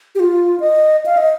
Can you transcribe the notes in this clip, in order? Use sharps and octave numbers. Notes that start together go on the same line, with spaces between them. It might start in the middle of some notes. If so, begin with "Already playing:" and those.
G4
F4
D#5
F5
D#5